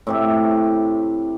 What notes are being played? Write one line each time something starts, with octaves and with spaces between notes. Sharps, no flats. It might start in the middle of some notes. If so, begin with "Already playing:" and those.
A2 C3 G4